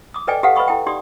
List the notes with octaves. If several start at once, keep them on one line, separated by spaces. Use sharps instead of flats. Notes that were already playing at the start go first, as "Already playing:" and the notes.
D6 D#6
A4 B4 D5 D#5 G5 G#5
G4 A4 B4 F5 F#5
B4 D#5 G#5 B5 C#6 D#6
E4 A4 G5
D#4 G4 D5 C6 D#6